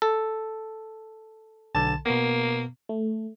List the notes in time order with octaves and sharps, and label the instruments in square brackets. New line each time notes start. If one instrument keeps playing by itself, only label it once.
[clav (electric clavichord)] A4
[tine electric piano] B1 D3 [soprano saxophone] A5
[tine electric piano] B2 B3 [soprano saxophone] A#3
[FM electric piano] A3